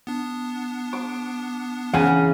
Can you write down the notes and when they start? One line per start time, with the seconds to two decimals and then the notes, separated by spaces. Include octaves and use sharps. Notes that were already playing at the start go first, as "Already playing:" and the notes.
0.07 B3 D4
0.93 D6
1.94 C#3 E3 F5 F#5 G#5